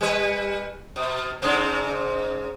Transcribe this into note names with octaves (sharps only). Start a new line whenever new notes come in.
G3 B4
B2
G#2 C#3 C4